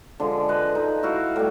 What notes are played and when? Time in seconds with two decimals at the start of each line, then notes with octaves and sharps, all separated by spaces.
0.20 D3 F3 G#3
0.49 B4 D#5
0.75 D#4 A4
1.03 E4 F#4 F5
1.36 A2 G3